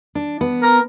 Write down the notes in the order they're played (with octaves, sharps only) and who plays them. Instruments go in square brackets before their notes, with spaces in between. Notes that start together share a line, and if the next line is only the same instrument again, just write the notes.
[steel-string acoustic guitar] D4
B3
[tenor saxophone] A#4